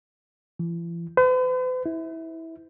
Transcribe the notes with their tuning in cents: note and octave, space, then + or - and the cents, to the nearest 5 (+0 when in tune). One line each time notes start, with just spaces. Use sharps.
E3 +45
B4 +45
E4 -20